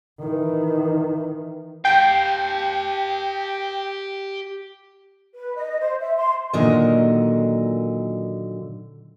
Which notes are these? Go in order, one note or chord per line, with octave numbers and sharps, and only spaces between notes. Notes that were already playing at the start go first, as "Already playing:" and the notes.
D#3 E3
G4 F5 G5
B4
D#5
C5
E5
C6
A#2 D3 D#3 F#3 A#4 D#5